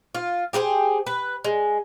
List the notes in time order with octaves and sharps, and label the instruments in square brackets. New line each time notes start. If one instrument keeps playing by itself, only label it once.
[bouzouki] F4
G4 G#4 B4 C5
B4
G#3